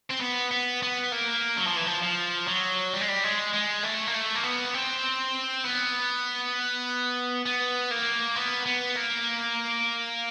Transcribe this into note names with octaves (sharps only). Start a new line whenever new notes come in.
C4
B3
B3
B3
A#3
F#3
F3
E3
F3
F3
F#3
G3
G#3
G3
G#3
G#3
A3
A#3
A3
A#3
B3
C4
B3
B3
A#3
B3
B3
A#3